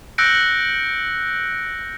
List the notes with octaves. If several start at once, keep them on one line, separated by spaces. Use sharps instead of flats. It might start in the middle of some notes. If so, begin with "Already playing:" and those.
E6 F#6 G6 A#6 C#7 D7